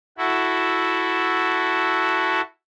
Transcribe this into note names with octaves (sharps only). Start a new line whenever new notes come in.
E4 F#4 A4